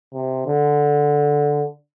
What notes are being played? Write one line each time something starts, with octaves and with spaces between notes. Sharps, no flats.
C3
D3